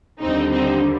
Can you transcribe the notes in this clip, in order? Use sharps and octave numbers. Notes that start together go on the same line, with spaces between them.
D#2 D3 G3 C4 D#4
C4 D#4